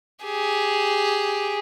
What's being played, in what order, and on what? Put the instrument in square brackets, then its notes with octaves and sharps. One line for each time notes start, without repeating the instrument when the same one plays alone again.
[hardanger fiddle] G4 G#4